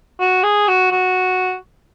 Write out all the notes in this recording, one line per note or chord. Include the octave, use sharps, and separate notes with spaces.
F#4
G#4
F#4
F#4